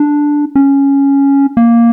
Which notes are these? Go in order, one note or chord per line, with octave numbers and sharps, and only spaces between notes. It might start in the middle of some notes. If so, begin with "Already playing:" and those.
Already playing: D4
C#4
A#3